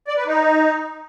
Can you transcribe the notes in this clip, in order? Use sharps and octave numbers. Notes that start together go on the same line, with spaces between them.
D5
B4
D#4